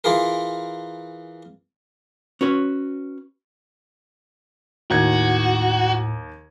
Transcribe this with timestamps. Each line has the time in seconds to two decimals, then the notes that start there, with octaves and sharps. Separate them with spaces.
0.04 E3 F4 G#4 A#4
2.41 C#4 F#4 B4 C#5
4.91 D#2 A2 F#4 G#6